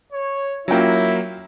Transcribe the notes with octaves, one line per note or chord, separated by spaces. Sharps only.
C#5
F#3 A#3 C#4 E4 F4 G5